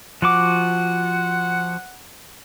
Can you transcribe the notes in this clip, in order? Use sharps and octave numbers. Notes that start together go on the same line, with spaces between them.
F3 F#4 F#5 D6